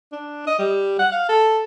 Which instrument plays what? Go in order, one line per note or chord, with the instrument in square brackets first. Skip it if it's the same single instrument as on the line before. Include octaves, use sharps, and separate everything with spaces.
[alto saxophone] D4
D#5
G3
F#5
F5
A4